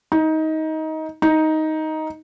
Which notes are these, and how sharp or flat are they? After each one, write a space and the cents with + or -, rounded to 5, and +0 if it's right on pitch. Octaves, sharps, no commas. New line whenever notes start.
D#4 +20
D#4 +10